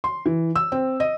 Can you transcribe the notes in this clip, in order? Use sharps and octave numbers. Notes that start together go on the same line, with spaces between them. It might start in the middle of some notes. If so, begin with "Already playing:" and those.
C6
E3
E6
C4
D#5